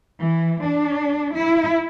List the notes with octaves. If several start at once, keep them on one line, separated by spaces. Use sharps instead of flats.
E3
D4
E4